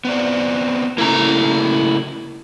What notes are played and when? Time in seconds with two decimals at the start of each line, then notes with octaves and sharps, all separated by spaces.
0.05 B3 C4 D5
0.98 C#3 A3 A#3 E4 A#5